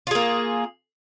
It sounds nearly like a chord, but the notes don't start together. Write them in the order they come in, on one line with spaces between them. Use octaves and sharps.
F4 G#4 A#3